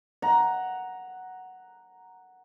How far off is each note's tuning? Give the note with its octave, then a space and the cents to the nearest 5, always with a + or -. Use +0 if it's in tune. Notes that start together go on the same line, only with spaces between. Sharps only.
F#5 +0 A#5 +0